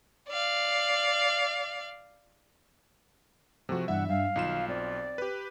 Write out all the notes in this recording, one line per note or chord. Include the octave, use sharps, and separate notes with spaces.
D5 F5
C3 F3 A3 F#4
G2 B2 E3 E5 F#5
G2 F5
B1 D#3 D#4 F4 E7
C4 D5
G4 B4